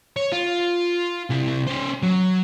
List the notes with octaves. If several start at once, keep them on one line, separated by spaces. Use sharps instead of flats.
C#5
F4
C3 E4
C#4 C5
F#3